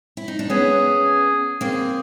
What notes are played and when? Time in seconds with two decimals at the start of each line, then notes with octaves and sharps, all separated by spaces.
0.17 E4
0.28 D#4
0.39 D4
0.50 B3 C#4 G#4
1.61 A#3 C4 G#4